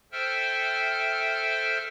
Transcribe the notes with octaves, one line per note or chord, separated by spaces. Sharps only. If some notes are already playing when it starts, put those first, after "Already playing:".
A4 C5 E5 G5 F6